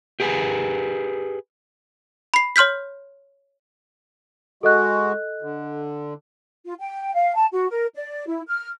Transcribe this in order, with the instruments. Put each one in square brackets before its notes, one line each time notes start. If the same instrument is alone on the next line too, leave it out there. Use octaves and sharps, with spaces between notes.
[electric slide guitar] G4 G#4 B4 G#5
[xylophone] B5 C7
C#5 C6 F6 G6 B6
[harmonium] G#3 F#4 [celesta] A4 D#5 F#6
[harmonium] D3
[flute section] F4
G5
F5
A5
F#4
A#4
D5
E4
F6